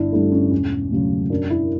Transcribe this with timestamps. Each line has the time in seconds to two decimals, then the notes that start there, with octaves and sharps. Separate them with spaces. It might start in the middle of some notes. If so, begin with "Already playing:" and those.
Already playing: G1 D4 E4
0.12 G2 D3 A3 E4
0.32 C#4
0.52 E1 C#4
0.91 D2 C#3 F#3
1.30 F#2 D4
1.50 E4